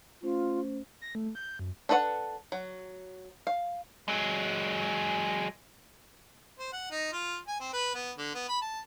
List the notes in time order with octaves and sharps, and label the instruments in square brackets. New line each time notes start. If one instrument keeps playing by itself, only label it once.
[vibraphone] A3 C#4 C5 [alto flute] F4
[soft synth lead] A#6
A3
G6
F#2
[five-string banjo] D4 A4 B4 D#5 F#5
F#3
F5
[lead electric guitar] F#3 G#3
[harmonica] C5
F#5
D#4
F4
G#5
C4
B4
B3
D3
B3
B5
A5